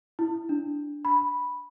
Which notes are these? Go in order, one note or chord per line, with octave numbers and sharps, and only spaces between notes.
E4
D4
B5